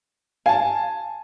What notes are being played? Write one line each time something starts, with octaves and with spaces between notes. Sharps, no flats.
F5 G#5 A5